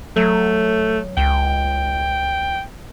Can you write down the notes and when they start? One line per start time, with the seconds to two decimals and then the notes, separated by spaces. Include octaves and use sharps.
0.16 F#3 A3
1.17 C#2 G5